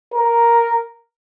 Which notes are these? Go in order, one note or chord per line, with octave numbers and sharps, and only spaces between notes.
A#4